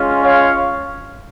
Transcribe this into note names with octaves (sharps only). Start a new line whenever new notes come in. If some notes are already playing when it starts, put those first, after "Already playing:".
Already playing: G#3 C#4 F4
C#5 F5